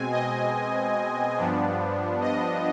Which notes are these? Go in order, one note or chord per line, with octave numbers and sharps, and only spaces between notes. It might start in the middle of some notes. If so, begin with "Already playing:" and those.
Already playing: B2 G#3 C4 G#5
D#5
G2 F3 B3 D4
D#5